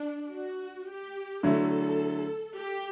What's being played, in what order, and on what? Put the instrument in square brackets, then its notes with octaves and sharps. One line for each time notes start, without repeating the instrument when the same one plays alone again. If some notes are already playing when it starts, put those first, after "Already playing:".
Already playing: [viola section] D4
F#4
G4
[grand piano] D3 F#3 A3 E4 [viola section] A4
[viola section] G4